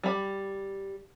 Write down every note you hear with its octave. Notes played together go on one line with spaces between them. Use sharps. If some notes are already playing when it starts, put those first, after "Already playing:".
G3 B5